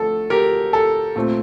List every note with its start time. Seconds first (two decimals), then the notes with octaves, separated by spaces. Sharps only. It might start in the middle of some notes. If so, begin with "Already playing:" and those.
Already playing: D3 F3 A3 A4
0.30 G4 A#4
0.73 A4
1.16 A#2 A3 C4